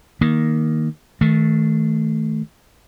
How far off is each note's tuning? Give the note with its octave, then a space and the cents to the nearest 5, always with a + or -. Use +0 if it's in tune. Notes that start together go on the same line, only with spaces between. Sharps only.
D#3 +0 A#3 +0
D#3 +30 A3 -10